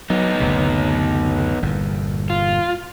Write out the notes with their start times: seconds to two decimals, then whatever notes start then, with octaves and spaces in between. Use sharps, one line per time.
0.10 F#3 B3 D#4
0.40 F#1 D2 C3
1.62 G1 E2 A#2
2.30 F4